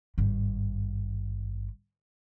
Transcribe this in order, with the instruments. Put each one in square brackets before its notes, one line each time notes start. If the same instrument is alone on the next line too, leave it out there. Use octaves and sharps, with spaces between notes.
[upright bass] G#1 G2